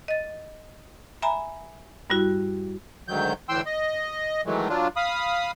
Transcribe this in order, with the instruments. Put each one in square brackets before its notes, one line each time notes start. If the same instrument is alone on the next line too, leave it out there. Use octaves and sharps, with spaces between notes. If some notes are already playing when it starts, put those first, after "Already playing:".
[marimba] D#5 A6
E5 G#5 A#5 B5
G2 G3 E4 F#4
[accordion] D2 G#2 D#3 F#3 G6
D2 A2 E3 G5 C6 E6
D#5
D#3 E3 F#3 G#3 A3
F#3 D4 F4
F5 B5 D#6